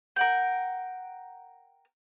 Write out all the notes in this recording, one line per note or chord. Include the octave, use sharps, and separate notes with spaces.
A#4 F#5 G5